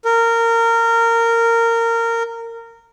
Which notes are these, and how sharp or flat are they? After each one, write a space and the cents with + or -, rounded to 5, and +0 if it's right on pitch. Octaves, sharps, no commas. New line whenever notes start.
A#4 -20